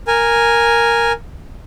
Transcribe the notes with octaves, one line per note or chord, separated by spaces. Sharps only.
A#4 G#5